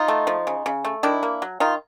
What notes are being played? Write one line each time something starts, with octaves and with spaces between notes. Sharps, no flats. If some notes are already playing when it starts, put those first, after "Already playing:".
Already playing: D#4 F4
A3
F3
C#3
C#3
A3
D#3 D4 E4
A#3
F#3
D#3 D#4 F4